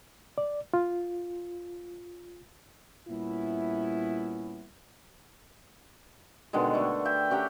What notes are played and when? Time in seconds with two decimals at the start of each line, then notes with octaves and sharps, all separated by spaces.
0.38 D5
0.74 F4
3.08 A#2 G3 B3 C#4 E4
6.53 B2 D3 D#3 G#3
6.74 A3 D4
7.05 E5 G5
7.30 C#4 G4 F#5 A#5